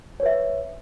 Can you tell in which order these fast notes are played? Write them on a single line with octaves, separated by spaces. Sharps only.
C#5 B4 E5